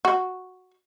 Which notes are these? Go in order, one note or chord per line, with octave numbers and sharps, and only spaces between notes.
F#4